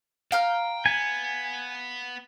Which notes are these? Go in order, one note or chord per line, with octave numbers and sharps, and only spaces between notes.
F5 G5 A#5 F6
B3 G#5